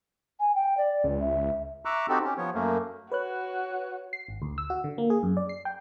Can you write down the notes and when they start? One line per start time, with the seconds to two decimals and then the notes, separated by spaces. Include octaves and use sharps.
0.40 G#5
0.55 G5
0.77 D5
1.04 C#2
1.21 E5
1.85 E5 A#5 C#6 D6 E6 F#6
2.09 C4 D#4 F#4 G4 A4
2.24 C#4 G4
2.38 F3 B3 C#5
2.54 F#2 A3 A#3
3.12 F#4 B4 C#5 F#6
4.13 C7
4.28 G#1
4.42 D2
4.58 E6
4.70 F#4
4.84 D3
4.98 A#3
5.10 G#4
5.23 F#2
5.37 D5
5.49 C7
5.65 G5